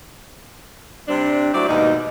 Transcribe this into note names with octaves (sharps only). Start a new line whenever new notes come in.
C3 G3 C4 D4
F#3 G3 A3 E4 C5 D5
D#2 G#2 B2 D#4